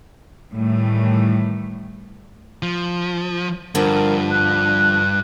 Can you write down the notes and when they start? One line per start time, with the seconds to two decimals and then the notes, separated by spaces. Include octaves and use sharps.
0.52 A2 D#3 E3 G3 A3
2.63 F3
3.75 G2 D3 F3 A#4
4.31 F#6